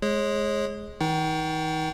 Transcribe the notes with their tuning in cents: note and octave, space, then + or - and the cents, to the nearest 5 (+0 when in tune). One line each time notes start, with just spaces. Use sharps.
G#3 +15 G#4 +0 C#5 -30
D#3 +45 D#4 +25 G5 -45